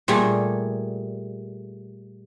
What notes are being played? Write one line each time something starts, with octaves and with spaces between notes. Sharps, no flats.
A#2 G3 A3 G#4 D5